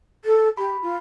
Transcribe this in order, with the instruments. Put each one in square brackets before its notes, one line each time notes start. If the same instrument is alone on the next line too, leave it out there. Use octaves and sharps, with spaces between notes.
[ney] A4
[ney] G4 [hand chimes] B5
[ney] F4